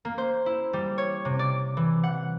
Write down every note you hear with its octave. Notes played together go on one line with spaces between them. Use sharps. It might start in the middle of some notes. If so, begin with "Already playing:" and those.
A#3
C5
E4
G3
C#5
C3
D5
E3
F#5